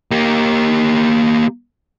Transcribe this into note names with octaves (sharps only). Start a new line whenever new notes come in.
A#3 G4